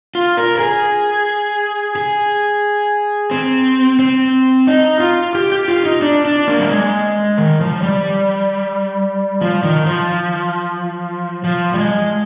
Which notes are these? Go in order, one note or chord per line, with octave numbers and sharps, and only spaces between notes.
F4
A#4
A#4
G#4
G#4
C4
C4
D#4
F4
G4
G4
F4
D#4
D4
D4
A#3
G3
G#3
D#3
F3
G3
F3
D#3
F3
F3
G3
G#3